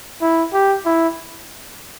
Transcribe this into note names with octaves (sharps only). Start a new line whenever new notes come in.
E4
G4
E4